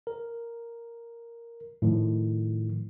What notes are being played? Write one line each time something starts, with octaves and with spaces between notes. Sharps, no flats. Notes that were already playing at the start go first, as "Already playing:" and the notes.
A#4
A2 D#3 F3